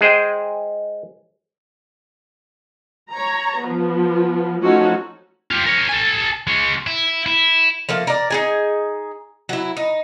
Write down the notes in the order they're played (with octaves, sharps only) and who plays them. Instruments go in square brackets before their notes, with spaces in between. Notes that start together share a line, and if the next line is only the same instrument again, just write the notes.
[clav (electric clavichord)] G#3 G#4 C5 D#5 G5
[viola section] C#5 A#5
F3 B3
F3 A3 C#4 D#4 F#4 A4
[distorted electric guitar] F4 G4
A#4 C#5
A4 G#5
G#3 C#5
E4
E4
[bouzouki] F3 A3 A#3
A#4 D5
D#4 G#4 G#5
F#3 E4
D#4